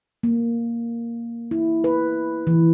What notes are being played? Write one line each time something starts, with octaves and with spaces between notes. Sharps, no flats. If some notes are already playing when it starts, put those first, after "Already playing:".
A#3
E4
B4
E3